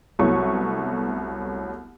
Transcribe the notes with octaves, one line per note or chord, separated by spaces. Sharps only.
C2 F#3 A3 B3 E4 C#6